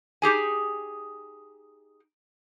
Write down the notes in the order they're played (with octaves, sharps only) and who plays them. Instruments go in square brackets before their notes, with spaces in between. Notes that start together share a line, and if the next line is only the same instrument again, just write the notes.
[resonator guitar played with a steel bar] D#4 G4 G#4 G#5